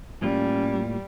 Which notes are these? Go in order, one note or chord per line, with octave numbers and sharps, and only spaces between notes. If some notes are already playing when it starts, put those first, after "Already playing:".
A2 G3 A#3 C#4 F4